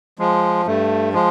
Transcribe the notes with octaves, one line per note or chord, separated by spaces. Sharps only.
F3 G#3
G2 A3
F3 G#3